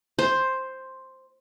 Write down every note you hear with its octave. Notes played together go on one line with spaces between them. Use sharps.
C5